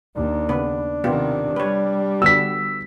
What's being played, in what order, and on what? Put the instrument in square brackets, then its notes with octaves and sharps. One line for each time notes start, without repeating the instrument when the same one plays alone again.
[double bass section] D#2 [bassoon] D4
[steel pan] C#3 B3 B4
[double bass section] C3 D#3 [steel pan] B3 F4 G4
[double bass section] G3 [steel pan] B4 C#5
[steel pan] D3 B3 F#4 [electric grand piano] E6 B6